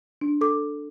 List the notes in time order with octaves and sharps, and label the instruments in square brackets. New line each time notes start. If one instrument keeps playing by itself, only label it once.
[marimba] D4
A4 D6